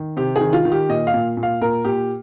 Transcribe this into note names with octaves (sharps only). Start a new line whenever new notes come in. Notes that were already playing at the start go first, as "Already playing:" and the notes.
Already playing: D#3
C3 G4
G#4
D#3
F4
D#3
G4
A#2 D#5
F5
A#2
A#2
F5
A#2 A#4
A#2 G4